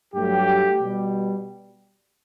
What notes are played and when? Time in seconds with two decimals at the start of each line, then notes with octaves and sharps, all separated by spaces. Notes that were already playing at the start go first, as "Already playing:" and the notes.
0.13 G2 F#3 A3 G4
0.80 B2 G3